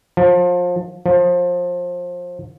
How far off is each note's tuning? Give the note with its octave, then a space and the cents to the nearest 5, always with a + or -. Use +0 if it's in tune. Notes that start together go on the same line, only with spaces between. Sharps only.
F3 +30
F3 +25